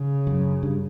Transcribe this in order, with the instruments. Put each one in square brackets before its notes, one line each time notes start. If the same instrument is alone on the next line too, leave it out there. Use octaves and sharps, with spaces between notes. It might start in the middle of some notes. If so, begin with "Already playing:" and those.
Already playing: [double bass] C#3
[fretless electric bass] F#2
G2